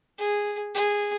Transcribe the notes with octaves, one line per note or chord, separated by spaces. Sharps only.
G#4
G#4